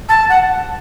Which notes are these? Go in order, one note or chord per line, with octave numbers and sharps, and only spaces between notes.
A5
F#5